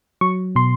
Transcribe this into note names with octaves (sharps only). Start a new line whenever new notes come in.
F#3 C#6
B2 C6